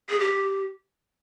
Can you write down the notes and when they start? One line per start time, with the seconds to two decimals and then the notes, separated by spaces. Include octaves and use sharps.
0.10 G#4
0.20 G4